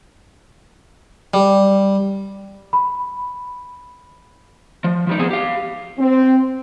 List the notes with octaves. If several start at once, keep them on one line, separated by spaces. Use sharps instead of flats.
G3
B5
F3
F3 G3 D#4
F3 B3 C4 G#4
G4 F5
C4